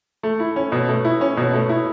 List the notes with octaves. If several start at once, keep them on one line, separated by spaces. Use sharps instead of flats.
A3
E4
C#4
B2
A3
E4
C#4
B2
A3
E4